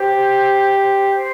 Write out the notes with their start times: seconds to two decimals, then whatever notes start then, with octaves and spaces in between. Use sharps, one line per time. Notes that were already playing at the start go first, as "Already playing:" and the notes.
Already playing: G4 C5
1.15 C5